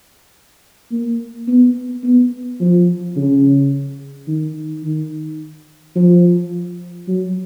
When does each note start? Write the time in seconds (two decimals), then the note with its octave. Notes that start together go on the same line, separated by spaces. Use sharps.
0.92 A#3
1.48 B3
2.03 B3
2.60 F3
3.16 C#3
4.28 D#3
4.84 D#3
5.96 F3
7.08 F#3